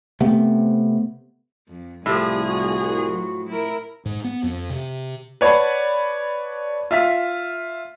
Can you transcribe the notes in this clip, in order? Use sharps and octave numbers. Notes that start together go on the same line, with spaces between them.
C3 A3 B3 C4
F2
C2 A2 F3 G4 G#4
F#4
F#3
E4 A#4
G#2
B3
F2
C3
B4 C#5 D5 F#5 A5 B5
F4 E5 F6 B6